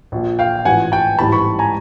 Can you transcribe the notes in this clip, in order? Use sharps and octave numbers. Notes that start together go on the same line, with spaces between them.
A#1 A#2 F3
F5 G5
A1 G#2 F3 F#5 G#5
G5 A5
A1 G#2 E3 G3 A5 B5
B5 C#6
G#5 A#5